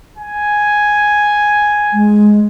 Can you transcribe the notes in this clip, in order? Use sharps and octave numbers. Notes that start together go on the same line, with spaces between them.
G#5
G#3